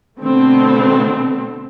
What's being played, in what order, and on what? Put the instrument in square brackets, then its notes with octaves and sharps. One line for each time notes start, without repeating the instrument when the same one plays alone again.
[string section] B2 D3 A3 B3 C4